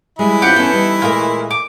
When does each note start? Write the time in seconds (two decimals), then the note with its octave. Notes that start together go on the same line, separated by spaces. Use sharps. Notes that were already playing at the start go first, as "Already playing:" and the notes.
0.19 E3 G3 G#3 E4
0.42 C4 C#4 F4 G4 F#5
0.56 B3 C#4 A4
0.73 G3 D#4
1.02 A#2 G#3 A3 F4 A#4
1.51 D6